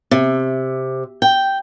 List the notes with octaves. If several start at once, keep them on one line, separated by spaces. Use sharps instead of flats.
C3
G5